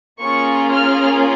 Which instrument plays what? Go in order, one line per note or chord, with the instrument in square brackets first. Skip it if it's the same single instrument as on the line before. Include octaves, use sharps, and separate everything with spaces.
[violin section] A#3 C#4 F4 G#4 C#6
F6